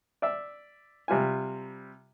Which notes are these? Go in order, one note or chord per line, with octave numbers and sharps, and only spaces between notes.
D5 E5
C3 G3 F4 G#5